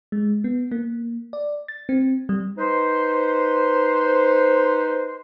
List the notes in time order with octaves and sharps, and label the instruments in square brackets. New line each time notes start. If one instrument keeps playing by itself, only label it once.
[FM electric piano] G#3
B3
A#3
D5
A6
C4
G3
[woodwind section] D#4 B4 C5